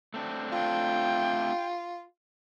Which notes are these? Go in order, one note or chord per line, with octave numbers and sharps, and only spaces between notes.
A3 C4 D4
F4 G5